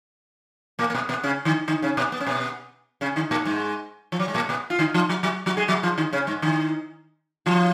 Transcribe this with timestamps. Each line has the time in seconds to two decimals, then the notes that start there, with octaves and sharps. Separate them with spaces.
0.79 A#2 A#3
0.90 A#3
0.95 B2 B3
1.09 B2 B3
1.24 C#3 C#4
1.45 D#3 D#4
1.68 D#3 D#4
1.82 C#3 C#4
1.97 B2 B3
2.12 B3
2.20 C#4
2.27 B2 B3
3.01 C#3 C#4
3.16 D#3 D#4
3.31 A#2 A#3
3.45 G#2 G#3
4.12 F3
4.19 F#3
4.28 G#3
4.34 A#2 A#3
4.49 B2 B3
4.70 F4
4.79 D#3 D#4
4.94 F3 F4
5.09 F#3 F#4
5.23 F#3 F#4
5.46 F#3 F#4
5.57 G#3 G#4
5.68 F#3 F#4
5.83 F3 F4
5.98 D#3 D#4
6.13 C#3 C#4
6.27 G#2 G#3
6.42 D#3 D#4
7.46 F3 F4